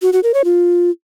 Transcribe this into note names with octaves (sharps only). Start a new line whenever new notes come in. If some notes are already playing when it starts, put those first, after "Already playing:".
F#4
F#4
A#4
C#5
F4